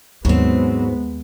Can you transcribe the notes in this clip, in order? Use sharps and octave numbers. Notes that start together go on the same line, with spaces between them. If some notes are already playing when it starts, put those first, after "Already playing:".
D#2 G#2 F#3 G#3 B3 C4